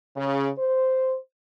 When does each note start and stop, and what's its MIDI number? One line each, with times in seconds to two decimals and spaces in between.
0.15 0.48 49
0.58 1.16 72